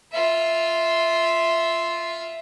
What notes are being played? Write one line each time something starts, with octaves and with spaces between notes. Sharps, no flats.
F4 E5